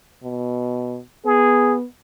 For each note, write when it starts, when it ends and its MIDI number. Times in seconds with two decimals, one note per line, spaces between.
0.24 0.98 47
1.26 1.84 59
1.26 1.75 68